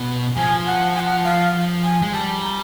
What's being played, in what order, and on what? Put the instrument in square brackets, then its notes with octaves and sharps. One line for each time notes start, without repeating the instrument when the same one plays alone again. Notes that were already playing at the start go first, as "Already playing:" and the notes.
Already playing: [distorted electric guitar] B2
[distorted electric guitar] F3 [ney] G#5
[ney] F#5
G#5
F#5
F5
G#5
[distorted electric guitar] G#3
[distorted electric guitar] G3 [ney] A5
[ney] A#5